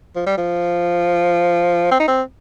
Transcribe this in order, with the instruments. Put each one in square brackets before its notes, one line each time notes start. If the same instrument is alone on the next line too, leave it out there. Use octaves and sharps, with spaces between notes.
[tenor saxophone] F3
G3
F3
C4
D#4
C4